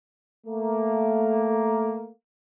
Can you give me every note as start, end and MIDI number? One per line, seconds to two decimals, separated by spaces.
0.47 2.10 57
0.47 2.10 58